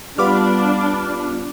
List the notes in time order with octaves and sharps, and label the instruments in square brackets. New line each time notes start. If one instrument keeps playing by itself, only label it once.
[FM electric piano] G3 B3 F4 [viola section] D4 [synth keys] B5 D6 F6